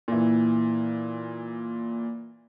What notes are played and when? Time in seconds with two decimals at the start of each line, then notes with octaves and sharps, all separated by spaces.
0.08 A#2 E3